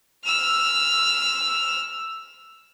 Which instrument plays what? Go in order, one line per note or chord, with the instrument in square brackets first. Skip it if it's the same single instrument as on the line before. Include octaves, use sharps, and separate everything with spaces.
[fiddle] E6 F6